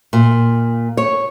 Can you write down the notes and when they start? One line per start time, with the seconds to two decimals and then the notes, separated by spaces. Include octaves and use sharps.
0.13 A#2
0.97 C#5